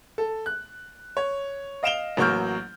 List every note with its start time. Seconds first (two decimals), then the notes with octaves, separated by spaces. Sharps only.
0.18 A4
0.46 F#6
1.17 C#5
1.83 D#5 F5 D7 E7 F7 G7
2.17 A1 F#3 A#3 C#6 F6 G6